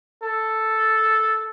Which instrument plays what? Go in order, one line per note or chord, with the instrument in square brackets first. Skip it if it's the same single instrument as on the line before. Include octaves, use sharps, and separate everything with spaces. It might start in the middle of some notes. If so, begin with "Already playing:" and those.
[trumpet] A4